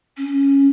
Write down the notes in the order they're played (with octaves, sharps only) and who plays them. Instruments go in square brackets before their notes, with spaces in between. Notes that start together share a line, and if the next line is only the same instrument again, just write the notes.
[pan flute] C#4